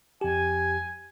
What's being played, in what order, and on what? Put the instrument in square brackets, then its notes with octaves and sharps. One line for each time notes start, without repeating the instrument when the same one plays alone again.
[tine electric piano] F2 G4 [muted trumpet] G#5